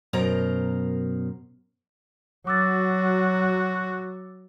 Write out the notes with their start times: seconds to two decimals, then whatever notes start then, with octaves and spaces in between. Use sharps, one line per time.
0.13 F#2 B2 A#4 C5 A#5
2.47 F#3 F#4 D6 E6 A6